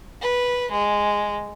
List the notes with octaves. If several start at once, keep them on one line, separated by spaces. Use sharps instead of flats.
B4
G#3